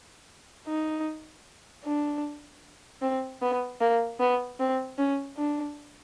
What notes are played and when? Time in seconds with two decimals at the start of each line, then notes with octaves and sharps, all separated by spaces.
0.67 D#4
1.85 D4
3.02 C4
3.42 B3
3.81 A#3
4.20 B3
4.60 C4
4.98 C#4
5.37 D4